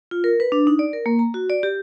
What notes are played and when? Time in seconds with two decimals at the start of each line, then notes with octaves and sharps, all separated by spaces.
0.11 F4
0.24 A#4
0.40 B4
0.52 D4
0.67 D#4
0.79 D5
0.93 A#4
1.06 A#3
1.19 A#5
1.34 F#4
1.50 D5
1.63 G4